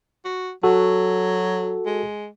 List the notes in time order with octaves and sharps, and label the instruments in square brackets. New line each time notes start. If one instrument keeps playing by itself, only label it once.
[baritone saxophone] F#4
[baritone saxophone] F#3 [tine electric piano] F#4 A4
[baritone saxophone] G#3